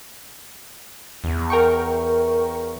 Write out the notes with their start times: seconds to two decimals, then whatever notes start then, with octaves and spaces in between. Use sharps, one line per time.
1.24 E2
1.50 A#4 G5 C#6